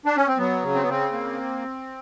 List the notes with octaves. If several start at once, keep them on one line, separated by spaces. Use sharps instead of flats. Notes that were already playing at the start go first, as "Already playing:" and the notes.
D4
C#4
C4
F#3 B3
C#3
C4
B3
C#3 C4
A#3